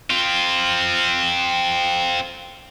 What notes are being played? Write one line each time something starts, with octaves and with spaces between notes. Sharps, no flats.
C4 F4